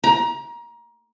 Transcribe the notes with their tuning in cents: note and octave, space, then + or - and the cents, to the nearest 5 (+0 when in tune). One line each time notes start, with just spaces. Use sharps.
A#5 +25